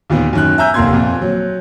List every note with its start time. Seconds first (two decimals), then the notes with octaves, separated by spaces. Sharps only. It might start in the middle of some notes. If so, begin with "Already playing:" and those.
0.10 D#2 A#2 D#3 B3
0.33 F#2 D#3 F#6
0.58 E5 G#5 A#5 E6 G6
0.74 F1 D#2 A#3 C6 G#6
0.93 F2 A#2
1.22 F#3